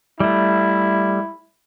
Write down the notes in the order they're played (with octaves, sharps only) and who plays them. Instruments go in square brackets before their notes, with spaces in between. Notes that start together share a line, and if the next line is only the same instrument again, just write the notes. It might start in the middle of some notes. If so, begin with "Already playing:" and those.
[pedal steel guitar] G3 A3 [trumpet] E4